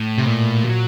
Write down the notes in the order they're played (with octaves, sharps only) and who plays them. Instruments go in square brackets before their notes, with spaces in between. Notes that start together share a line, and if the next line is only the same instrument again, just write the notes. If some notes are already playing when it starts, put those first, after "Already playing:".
Already playing: [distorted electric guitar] A2
[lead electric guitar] C3
A#2
[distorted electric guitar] F#3